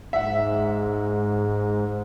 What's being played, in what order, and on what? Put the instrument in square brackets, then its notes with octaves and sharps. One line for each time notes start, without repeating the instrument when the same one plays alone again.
[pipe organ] G#2 [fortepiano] E5 F#5